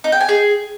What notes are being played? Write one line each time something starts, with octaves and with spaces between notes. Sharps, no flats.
D#4
G5
G#5
G#4